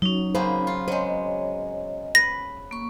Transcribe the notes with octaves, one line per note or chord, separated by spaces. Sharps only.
F#3 C#4 D#4
C#3 A#3 B3 C5
F4
F#3 G#3 C5 C#5 D#5
B4 A#6
A#3 C#6